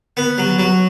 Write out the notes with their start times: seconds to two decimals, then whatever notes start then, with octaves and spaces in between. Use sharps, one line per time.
0.17 B3
0.38 F#3
0.59 F#3